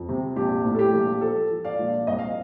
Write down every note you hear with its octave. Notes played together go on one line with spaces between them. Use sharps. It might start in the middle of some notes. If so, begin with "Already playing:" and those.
Already playing: F2
C3
A#1 G4
A2
A4
G4
A#1
F3 A4
F3
D5 F5
A#1
C2 D#5
F5